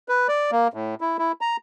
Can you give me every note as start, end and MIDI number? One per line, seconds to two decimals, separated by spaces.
0.09 0.27 71
0.28 0.51 74
0.52 0.68 58
0.74 0.95 45
1.01 1.17 64
1.18 1.32 64
1.41 1.57 82